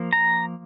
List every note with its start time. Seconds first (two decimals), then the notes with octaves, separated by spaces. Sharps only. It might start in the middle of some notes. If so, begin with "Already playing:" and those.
Already playing: F3 A#3
0.13 A#5